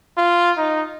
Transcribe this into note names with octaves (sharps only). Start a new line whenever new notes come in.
F4
D#4